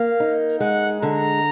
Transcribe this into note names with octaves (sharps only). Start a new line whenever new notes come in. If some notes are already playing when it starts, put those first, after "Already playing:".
Already playing: A#3 F5
D#4
G#3 F#5
D3 A#5